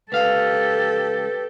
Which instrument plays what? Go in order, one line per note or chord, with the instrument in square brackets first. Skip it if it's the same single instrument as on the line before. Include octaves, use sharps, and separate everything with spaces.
[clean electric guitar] C#2 F5 [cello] G4 A4 [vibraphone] B4